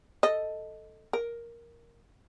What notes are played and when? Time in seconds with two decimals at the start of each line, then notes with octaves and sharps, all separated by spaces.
0.23 A4 D#5
1.13 A#4